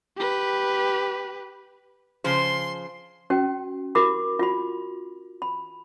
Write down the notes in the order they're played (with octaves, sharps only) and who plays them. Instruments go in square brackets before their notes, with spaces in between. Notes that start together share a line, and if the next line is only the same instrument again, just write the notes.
[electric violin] G4 B4
[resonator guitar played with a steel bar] C#3 F3 C5 [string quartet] C6
[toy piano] C#4 F#4 G5
E4 F#4 G4 A#4 B5 D6
F4 F#4 B5
B5